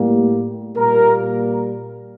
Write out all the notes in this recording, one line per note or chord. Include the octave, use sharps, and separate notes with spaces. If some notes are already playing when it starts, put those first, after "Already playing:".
Already playing: A2 G3 A#3
A#2 G3 A#3 A#4